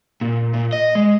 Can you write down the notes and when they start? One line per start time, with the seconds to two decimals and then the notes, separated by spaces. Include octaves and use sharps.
0.21 A#2
0.54 A#2
0.73 D#5
0.95 G#3